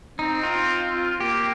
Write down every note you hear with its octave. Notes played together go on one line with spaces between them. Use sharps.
C4 D#4
F4
A#3 G4